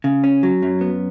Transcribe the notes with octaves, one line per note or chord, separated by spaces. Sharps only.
C#3
C#4
F#3
F#2
B3